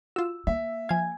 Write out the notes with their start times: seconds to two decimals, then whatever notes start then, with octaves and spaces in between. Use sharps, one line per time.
0.16 F4 F#4 E6
0.47 A#3 E5
0.89 F3 F5 G#5 G#6